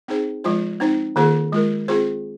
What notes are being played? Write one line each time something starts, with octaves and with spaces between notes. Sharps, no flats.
C4 D#4 G#4 C5
F3 G#3 F4 C5
C4 D#4 C5
D#3 A#3 F4 G#4 C5
G#3 F4 A#4
C4 F4 G#4 C5